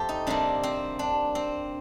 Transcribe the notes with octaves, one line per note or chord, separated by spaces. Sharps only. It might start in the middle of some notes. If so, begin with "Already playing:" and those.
Already playing: F2 A3 G4 A4 C5
D#4
C3 G3 A#3 D4
C4
D4
C4